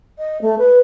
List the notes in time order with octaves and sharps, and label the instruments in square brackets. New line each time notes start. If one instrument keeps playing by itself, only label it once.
[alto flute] D#5
A3
B4